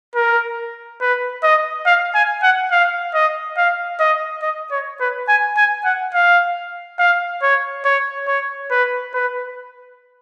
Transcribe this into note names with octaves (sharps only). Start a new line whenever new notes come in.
A#4
B4
D#5
F5
G#5
F#5
F5
D#5
F5
D#5
D#5
C#5
B4
G#5
G#5
F#5
F5
F5
C#5
C#5
C#5
B4
B4